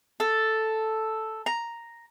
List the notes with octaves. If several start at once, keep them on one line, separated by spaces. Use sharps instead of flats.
A4
A#5